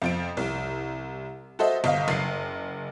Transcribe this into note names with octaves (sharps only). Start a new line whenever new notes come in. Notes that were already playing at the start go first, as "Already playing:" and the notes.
F2 F3 D7
C2
F#4 A4 C5 D#5 E5
G1 D#5 F5
F#1 C7